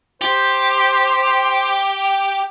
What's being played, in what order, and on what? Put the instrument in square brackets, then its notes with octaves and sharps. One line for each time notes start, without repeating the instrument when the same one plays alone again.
[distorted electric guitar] G4 [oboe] C5